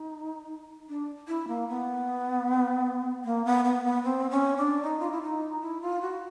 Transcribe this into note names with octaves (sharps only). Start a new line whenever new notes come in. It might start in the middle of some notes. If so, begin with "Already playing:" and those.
Already playing: D#4
D4
E4
A#3
B3
A#3
B3
B3
B3
C4
C#4
D4
D#4
F4
E4
D#4
E4
F4
F#4